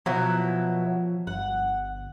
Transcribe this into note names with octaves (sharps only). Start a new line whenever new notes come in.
B2 F3 F#3 E4
G1 F#5